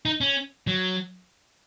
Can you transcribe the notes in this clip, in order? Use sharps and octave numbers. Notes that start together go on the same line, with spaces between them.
D#4
C#4
F#3